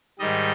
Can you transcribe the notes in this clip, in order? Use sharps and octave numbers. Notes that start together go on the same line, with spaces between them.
G#2 D#3 G3 D#5